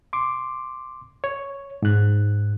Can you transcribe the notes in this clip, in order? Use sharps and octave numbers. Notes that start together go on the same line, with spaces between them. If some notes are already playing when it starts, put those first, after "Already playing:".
C6 D6
C#5
G#2 F#6